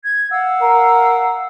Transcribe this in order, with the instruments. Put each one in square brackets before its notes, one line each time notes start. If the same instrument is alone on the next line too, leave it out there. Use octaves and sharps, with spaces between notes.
[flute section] G#6
F5 F#5 E6
[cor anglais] A#4